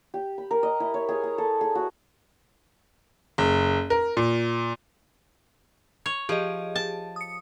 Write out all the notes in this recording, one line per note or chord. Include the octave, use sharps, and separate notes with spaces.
G4
B5
A#4
D#5
E4
C#5
G#4
A#5
A4
G#4
F#4
F#1
A#4
A#2
C#5
F3 G4 G#4 D#5
A5
D#6 C#7